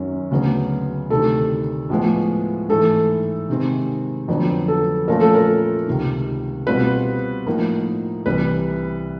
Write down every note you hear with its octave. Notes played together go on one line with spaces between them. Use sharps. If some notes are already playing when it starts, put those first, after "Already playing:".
Already playing: F#2 D#3 F#3 C#4
D2 C#3 F#3 B3
D2 C3 D#3 A4
A2 F3 G#3 B3
G#2 E3 A3 A4
C3 D#3 G#3 C4
F2 D3 F#3 B3
A4
A#2 F3 A3 C#4 F4 A#4
A4
A#4
C#2 C3 D#3
B2 G3 C4 F4 B4
A2 F3 A#3 D#4
C2 C3 E3 B4